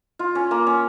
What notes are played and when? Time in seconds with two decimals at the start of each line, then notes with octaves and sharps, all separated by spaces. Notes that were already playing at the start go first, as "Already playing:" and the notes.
0.19 F4
0.35 C#4
0.51 A#3
0.67 C#4